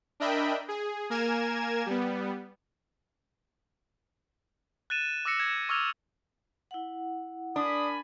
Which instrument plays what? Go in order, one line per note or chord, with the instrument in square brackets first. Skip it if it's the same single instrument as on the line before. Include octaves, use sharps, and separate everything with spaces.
[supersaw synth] D4 A#4 D#5 E5 G5 B5
G#4
A#3 A#4 G#5 G#6 E7
G3 B3
[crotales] F#6 A6 D#7 E7
D6 E6 A#6 C#7
G#6 A#6
C#6 D6 E6 F6 G#6 F7
[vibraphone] E4 F#5
[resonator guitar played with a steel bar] D4 [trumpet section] A#4 G#5 B5 [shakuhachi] D#6